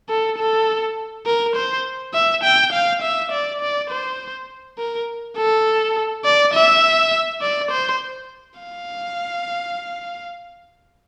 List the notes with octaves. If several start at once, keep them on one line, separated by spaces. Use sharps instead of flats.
A4
A4
A#4
C5
E5
G5
F5
E5
D5
D5
C5
A#4
A4
D5
E5
D5
C5
F5